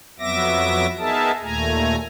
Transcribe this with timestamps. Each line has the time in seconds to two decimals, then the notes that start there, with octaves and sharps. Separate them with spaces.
0.19 F2 F#3 B3 E5 D6 A#6
0.99 B3 D#4 G#4 A#4 E5 A5
1.43 D#2 A#2 A3 G#5 A#5